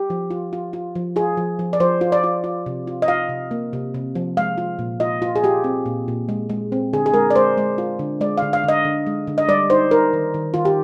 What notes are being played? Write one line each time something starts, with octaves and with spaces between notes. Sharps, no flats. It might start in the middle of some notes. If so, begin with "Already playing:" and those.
Already playing: G4
F3
F4
F4
F4
F3
F4 G#4
F3
F3
D5
F3 C5
F4
D5
F4
F4
C3
F4
D#5
F4 F5
C3
A#3
C3
C3
F3
G#3 F5
F4
A#2
F4 D#5
F4
G#4
F4 G4
C4
A#2
A#2
G#3
G#3
C4
D3 G#4
G#4
G#3 A#4
D5
G#3 C5
G#3
F4
D3
G#3 D5
F5
D3
F5
D3 D#5
D3
G#3
D3
D#5
G3 D5
D#4 C5
D#4 A#4
D#3
D#3
D#3 F4
G4